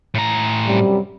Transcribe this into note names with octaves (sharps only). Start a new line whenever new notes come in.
A2 A#5
F#2 C3 G3